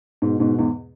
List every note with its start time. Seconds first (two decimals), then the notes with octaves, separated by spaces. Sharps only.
0.22 G#2 B2
0.40 G#2 B2
0.59 E2 G#2